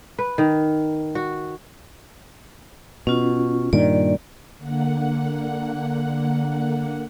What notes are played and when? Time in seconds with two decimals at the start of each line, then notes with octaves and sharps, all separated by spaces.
0.19 B4
0.38 D#3
1.15 F#4
3.07 B2 C#4 F4
3.73 G2 A#2 D#3 D5
4.59 D3 A#3 F#5